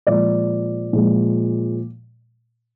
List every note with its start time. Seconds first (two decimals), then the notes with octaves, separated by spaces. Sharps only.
0.07 A#2 F3 G#3 D5
0.93 A#2 F3 G#3